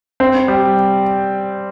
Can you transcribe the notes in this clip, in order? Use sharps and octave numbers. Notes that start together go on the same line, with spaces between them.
C4
G3